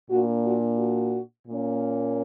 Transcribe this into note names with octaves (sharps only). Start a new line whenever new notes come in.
A#2 A#3 D4 F#4
F#4
F#4
A#2 A#3 C#4